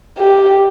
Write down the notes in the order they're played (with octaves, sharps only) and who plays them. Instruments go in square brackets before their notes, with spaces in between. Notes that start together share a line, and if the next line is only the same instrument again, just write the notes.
[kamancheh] G4